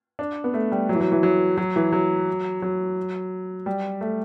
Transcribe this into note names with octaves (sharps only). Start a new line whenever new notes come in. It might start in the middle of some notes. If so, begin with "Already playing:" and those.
D4
B3
A3
G3
F#3
E3
F#3
E3
F#3
F#3
E3
F#3
F#3
G3
A3